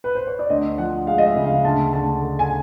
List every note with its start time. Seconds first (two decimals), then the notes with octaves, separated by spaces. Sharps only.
0.04 B4
0.15 C5
0.27 C#5
0.39 D5
0.50 D2 D#5
0.78 F3 F#5
1.07 G#3 F5
1.18 D#5
1.26 E5
1.36 C#3
1.45 F5
1.65 D2 A5
1.93 D2 A5
2.22 D3
2.39 G#5